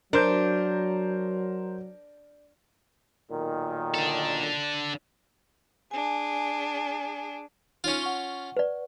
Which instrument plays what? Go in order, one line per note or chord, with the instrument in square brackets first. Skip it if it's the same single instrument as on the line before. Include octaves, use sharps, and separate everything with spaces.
[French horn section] F#3 [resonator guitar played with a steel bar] D4 [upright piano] A#4 C5 G6
[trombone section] B1 A#2 D#3
[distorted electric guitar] D4 A4
[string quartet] D4 G#4 [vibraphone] G#5
[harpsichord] C#4 F4 [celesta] D#4 C#5 D#7
[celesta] F#5 C#6 G7
[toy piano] B4 D5